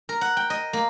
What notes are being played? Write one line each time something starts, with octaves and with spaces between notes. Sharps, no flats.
A#4
F#5
G5
D#5
A#3